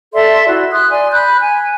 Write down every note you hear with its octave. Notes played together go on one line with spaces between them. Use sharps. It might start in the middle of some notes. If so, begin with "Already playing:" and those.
A4 D5 E5 C6
E4 F#4
C6 D#6 F#6
D5 G#5 C6
B5 F#6 G6
G#5